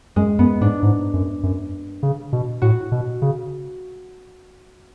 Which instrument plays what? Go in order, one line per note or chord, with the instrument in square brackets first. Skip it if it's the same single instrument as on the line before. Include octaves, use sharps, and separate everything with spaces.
[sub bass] F#2 [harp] G#3
[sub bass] F#2 [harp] B3
[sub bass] G#2 [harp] D4
[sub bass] G#2
F#2
F#2
C#3
B2
[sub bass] A2 [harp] F#4
[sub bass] B2
C#3